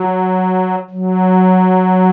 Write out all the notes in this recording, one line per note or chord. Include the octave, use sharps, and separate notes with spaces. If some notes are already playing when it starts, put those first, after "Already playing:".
Already playing: F#3
F#3